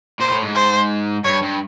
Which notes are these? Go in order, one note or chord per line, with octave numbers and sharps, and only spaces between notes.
A#2 C5
A2
G#2
C5
G2 C#5
G2